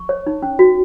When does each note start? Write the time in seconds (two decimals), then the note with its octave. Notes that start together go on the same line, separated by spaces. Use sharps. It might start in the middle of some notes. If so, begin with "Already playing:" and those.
Already playing: C#6
0.09 C#5
0.27 D#4
0.42 C#4
0.59 F#4